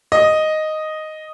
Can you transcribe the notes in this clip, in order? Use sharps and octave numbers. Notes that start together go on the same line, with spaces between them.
D#5